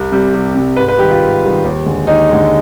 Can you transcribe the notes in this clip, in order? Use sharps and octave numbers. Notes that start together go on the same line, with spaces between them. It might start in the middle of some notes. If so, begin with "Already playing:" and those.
Already playing: C2
C3 G3
C2
C3 G3
G#2 B4
B4
D#3 G3 G4
F4
G#2
D#3 G3
D#2
D3 G#3
D#2 D#4
D3 G#3